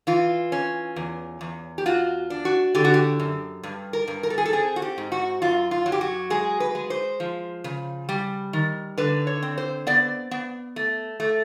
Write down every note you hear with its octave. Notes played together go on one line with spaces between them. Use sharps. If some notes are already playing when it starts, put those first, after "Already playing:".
E3 F4
C#4
E2
E2
G4
F4 F#4
D4
F#4
D3 G4
F#4
G4
F#2
G2
A#4
G2
A#4
A4
G#4
A4
C4 G#4
F#4
G4
G#2
F#4
F#2 F4
F4
F#3
G4
F#4
G#3 G#4
B4
G#3
C5
F3
C#3
G3
D#3
D3 B4
C#5
C4
C5
B3 D5
B3
A3
A3